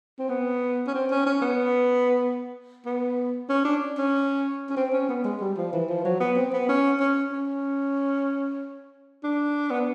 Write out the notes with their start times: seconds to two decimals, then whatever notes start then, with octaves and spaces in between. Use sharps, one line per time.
0.19 C4
0.30 B3
0.87 C#4
0.95 C4
1.10 C#4
1.26 C#4
1.42 B3
2.86 B3
3.49 C#4
3.65 D4
3.98 C#4
4.70 C#4
4.77 C4
4.93 C#4
5.09 B3
5.24 G#3
5.41 G3
5.57 F3
5.73 E3
5.89 F3
6.05 F#3
6.20 B3
6.37 C4
6.53 B3
6.69 C#4
7.00 C#4
7.32 C#4
9.24 D4
9.71 B3